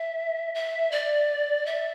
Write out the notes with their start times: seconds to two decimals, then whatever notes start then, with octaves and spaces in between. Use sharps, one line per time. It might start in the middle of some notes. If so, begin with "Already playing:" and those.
Already playing: E5
0.55 E5
0.92 D5
1.66 E5